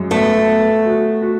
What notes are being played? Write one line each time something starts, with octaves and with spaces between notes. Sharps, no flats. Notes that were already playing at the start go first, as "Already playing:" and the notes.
Already playing: F#2 G#3
A3 B3
B3
F#4
F#4